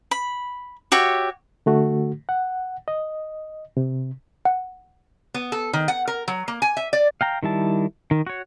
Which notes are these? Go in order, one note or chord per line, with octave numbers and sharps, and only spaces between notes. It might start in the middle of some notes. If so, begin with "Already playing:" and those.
B5
F#4 G4 C#5 E5
D3 A3 F#4
F#5
D#5
C3
F#5
B3
A4
D#3
F#5
A#4
F#3
A#3
G#5
E5
D5
F5 G5 A#5
D#3 G3 E4 A5
D#3
F#4 C#5